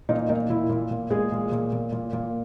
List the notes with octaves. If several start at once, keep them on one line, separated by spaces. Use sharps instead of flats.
A#2 D#4
A#2 D#4
A#2 E4
A#2
A#2
A#2 G#3 G#4
A#2
A#2
A#2
A#2
A#2